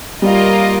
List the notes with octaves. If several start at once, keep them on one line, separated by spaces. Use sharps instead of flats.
G3 A#3 F4 A#4 D#5